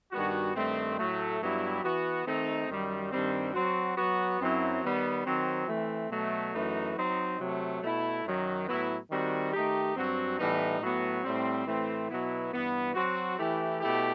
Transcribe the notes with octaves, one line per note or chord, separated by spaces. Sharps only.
G2 D#3 G3 B3 F#4
G2 D#3 A3 C4
A2 F#3 A3
G2 F#3 B3 E4 G4
E3 B3 F#4
D#3 A3 C4 D#4
F#2 D#3 G3
G2 D#3 G3 C4
F#3 C4 F#4
F#3 B3 F#4
F#2 F#3 C4 E4
D#3 G3 B3
D#3 F#3 C4
E3 A3 C4
B2 F#3 A3
F#2 E3 A3 D#4 F#4
F#3 C4 D#4
C3 F#3 A3
B2 A3 E4
F#2 D#3 F#3
A2 F#3 B3 E4
D#3 G3 C4 F#4
D#3 A3 D#4 G4
G2 F#3 C4 F#4
A2 E3 G3 B3 D#4
A2 F#3 B3 F#4
A2 G3 C4
A2 E3 A3 C4
B2 F#3 B3 E4
G2 E3 B3
F#3 C4 F#4
E3 A3 E4 G4
B2 A3 E4 G4